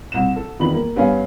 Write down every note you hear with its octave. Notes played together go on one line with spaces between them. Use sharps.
C2 E7
A4
E2 D#3 F4 B5 F#7
A#3
G2 B3 C#4 F5 G#5